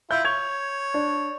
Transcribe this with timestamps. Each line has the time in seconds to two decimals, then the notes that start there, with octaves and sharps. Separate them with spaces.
0.11 E4 F4 G6
0.25 C#5 G#6 F7
0.94 D4